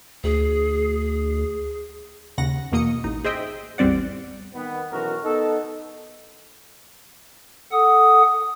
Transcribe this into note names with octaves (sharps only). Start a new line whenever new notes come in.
D2 G#4
D#2 C#3 F#5 A#6
E2 B2 A#3 D#5 D#6 C#7
A1 D#4
G#4 C5 D#5 E5 G5
A1 E2 G3 C4 D5 F#5
D#3 B3
B1 B2 E3 C#4 F#4 A#4
B3 D#4 A4
A4 F#5 D#6